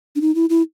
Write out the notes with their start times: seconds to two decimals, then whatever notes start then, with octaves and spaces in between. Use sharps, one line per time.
0.16 D4
0.21 D#4
0.35 E4
0.50 E4